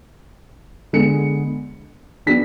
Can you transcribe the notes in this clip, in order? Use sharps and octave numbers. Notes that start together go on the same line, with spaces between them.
D3 G#3 B3 C#7
F#3 B3 D4 B6